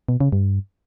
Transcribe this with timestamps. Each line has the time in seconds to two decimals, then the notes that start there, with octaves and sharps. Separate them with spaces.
0.09 B2
0.21 C#3
0.32 G2